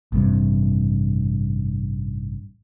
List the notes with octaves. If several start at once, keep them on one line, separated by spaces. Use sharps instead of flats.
A1 G2 C3